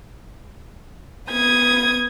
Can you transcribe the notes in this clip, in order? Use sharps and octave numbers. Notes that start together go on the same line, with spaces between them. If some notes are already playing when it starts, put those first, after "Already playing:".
B3 D#6 G#6